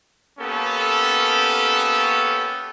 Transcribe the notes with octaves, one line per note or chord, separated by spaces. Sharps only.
A#3 B3 C#4 G4 A4